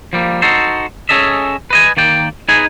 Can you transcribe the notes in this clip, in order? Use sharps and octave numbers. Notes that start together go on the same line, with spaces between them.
F3 G3 A#3
D#4 F#4 A4 C5
C#4 G#4 A4 D#5 E5
B4 D#5 G#5
D#3 A#3 D5 G5
D#4 G#4 B4 D#5 G#5